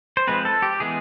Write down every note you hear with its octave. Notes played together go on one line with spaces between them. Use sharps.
C5
F3 G#3 C4 B4
A4
G4
E3 G#3 B3 G#4